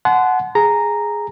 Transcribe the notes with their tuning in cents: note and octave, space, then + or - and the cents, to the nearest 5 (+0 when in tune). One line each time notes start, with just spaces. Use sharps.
F#5 +0 A5 -45 C6 -30
G#4 +0 A#5 -5